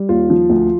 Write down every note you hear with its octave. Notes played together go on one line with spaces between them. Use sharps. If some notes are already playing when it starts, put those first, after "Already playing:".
Already playing: G3
D#2 F4
F3
D2